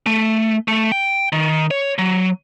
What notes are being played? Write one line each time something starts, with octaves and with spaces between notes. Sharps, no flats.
A3
A3
G5
D#3
C#5
F#3